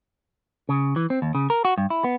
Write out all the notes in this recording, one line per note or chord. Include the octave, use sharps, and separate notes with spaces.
C#3
E3
C4
D#2
C#3
A#4
F#4
G2
E4
B3